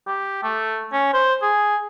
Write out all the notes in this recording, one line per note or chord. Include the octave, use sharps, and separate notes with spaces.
G4
A3
C#4
C5
G#4